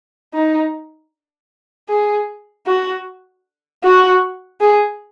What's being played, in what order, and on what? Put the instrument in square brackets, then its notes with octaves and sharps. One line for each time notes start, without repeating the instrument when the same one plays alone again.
[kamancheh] D#4
G#4
F#4
F#4
G#4